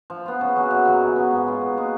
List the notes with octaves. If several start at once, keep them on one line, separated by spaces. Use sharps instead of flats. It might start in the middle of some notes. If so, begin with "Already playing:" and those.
F3
B3 F4
C#3
F#3 C#4 F#4
F#2
D#3 F#3 C#4
F3
B3 D#4 G#4
G#2
F#3 B3 F4
A#2
G#3 D#4 F#4